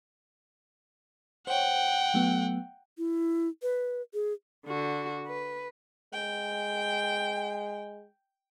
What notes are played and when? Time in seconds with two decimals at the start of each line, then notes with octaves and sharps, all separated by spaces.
1.47 C5 C#5 F#5 G5
2.14 F#3 A3 B3
2.98 E4
3.62 B4
4.14 G#4
4.66 D3 F#4
5.27 B4
6.13 G#3 G5